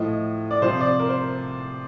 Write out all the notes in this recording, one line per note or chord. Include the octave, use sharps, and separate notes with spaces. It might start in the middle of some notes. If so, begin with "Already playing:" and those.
Already playing: A2 F3 D#5
D5
C3 F3 C5
D5
A#4
C5